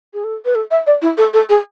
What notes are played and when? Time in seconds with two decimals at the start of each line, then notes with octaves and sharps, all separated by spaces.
0.14 G#4
0.24 A4
0.45 B4
0.55 A4
0.71 E5
0.87 D5
1.02 E4
1.18 A4
1.33 A4
1.49 G#4